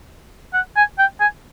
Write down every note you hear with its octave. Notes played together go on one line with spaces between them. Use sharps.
F#5
G#5
G5
G#5